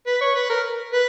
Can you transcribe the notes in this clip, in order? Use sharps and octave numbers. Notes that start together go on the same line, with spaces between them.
B4
C#5
B4
A#4
B4